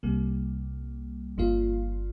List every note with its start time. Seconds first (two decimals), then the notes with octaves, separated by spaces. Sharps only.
0.03 C2 C3 G3 A#3
1.37 G1 G2 F3 A#3 F4